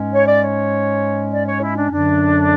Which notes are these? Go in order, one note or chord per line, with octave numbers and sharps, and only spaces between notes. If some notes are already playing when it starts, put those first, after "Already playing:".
Already playing: G#2 G#3 C#4
C#5
D5
C#5
D5
C#5
E4
D4
F#2 D3 F#3 D4